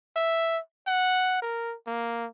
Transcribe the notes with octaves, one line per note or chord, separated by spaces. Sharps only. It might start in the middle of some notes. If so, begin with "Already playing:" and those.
E5
F#5
A#4
A#3